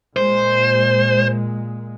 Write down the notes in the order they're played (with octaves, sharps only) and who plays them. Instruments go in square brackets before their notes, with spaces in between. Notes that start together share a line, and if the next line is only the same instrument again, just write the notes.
[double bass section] A#2 G#3 [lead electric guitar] C5